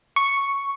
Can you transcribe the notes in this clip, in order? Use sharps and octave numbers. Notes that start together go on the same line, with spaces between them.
C#6